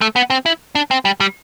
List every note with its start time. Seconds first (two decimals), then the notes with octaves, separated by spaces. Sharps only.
0.01 A3
0.16 B3
0.30 C4
0.46 E4
0.75 D4
0.91 C4
1.05 G3
1.20 G3